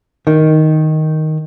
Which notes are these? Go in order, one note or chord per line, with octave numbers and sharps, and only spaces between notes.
D#3